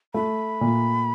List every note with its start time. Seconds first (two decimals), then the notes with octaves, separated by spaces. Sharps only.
0.14 A3 B5
0.61 A#2